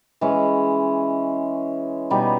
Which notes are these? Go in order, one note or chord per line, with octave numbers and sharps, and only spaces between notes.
E3 G#3 C#4
B2 G3 B3 D#4